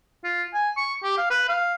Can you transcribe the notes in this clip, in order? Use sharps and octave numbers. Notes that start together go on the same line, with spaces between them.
F4
G#5
C#6
G4
F5
B4
F5